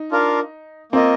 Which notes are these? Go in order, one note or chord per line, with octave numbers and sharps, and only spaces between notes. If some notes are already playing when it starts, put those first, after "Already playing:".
Already playing: D#4
D4 F4 A#4 F5
A#3 C4 F4 A#4 D#5